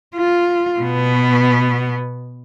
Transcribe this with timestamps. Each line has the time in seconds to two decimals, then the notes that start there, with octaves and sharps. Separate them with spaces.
0.16 F4
0.80 B2 B3